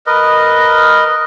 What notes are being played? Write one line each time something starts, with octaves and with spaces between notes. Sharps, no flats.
A#4 B4 D#5